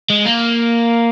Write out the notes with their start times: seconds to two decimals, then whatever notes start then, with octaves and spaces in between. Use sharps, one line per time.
0.10 G#3
0.25 A#3